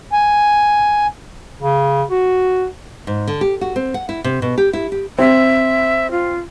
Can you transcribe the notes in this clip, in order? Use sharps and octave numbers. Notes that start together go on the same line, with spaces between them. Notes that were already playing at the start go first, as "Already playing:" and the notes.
G#5
C#3
F#4
G#2
D3
G4
F#4
C4
F#5
E4
C3
B2
G4
E4
G4
C4 E5
F4